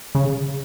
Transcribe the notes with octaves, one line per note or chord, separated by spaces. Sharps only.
C#3